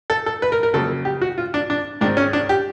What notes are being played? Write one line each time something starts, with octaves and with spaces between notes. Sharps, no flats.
A4
A4
B4
A#4
A#4
F2 C#3 F#3 A#3 A4
G4
F#4
F4
D4
D4
G#2 D#3 G#3 C4 D4
C#4
D4
G4